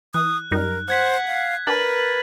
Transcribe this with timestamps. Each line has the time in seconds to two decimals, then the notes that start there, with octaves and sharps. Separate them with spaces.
0.14 E3 D#6 F#6
0.51 F#2 G3 D#4 A#4
0.88 C5 F#5 F#6 G#6 B6
1.27 F5
1.67 D4 A#4 B4 A6 F#7